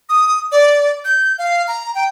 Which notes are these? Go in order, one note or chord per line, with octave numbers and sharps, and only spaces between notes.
D#6
D5
G6
F5
A#5
G5